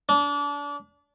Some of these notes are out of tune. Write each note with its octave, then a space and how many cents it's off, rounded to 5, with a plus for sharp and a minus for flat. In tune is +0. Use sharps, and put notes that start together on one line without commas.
D4 -30